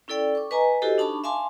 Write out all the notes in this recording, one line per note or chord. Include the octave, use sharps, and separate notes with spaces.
C#4 E4 A4 D5 G5
C#6 D6
B4 D#5 G#5 A#5
E4 F#4 G4 A4 C5 D#5
D4 D#4 A5 B5 C#6 D6
E5 F5 G#5 A5 C6 D6